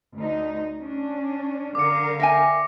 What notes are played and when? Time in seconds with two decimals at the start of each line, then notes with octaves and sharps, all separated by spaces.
0.15 D2 D#4
0.79 C#4 D4
1.75 D3 A#4 F5 D6 C#7
2.20 E5 G5 G#5 A#6